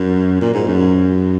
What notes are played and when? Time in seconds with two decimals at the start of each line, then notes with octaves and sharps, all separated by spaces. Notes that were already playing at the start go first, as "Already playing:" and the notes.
Already playing: F#2
0.41 A#2
0.54 G#2
0.67 F#2